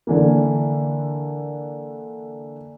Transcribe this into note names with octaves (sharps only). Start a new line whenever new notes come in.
D3 E3 A#3